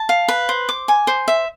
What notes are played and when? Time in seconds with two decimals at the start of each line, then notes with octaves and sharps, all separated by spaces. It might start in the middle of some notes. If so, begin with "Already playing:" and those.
Already playing: A5
0.09 F5
0.28 B4
0.49 C5
0.69 D6
0.88 G#5
1.07 C5
1.28 E5